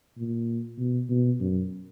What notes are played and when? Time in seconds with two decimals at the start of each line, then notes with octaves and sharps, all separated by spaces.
0.18 A#2
0.78 B2
1.10 B2
1.40 F#2